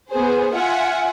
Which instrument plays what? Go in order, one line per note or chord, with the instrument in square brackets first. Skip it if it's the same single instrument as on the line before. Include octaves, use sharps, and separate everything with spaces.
[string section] B3 G#4 C5
F4 E5 F#5 G#5